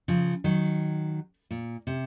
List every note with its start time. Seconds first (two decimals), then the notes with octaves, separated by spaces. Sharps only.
0.08 C#3 F3
0.44 D#3 F#3
1.51 A#2
1.87 C3